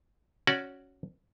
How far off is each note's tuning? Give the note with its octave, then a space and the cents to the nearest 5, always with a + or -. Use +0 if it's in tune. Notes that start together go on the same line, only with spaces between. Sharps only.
C#4 +0 F#4 +0 D5 +0